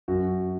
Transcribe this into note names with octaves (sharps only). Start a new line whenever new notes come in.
F#2 F#4